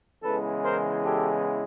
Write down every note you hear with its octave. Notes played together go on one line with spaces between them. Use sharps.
E2 C#3 E3 G#3 A4 B4
A#4 C5
G4 A4